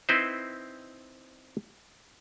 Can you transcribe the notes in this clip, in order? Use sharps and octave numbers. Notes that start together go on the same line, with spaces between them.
C4 D#4 E4 B4 C5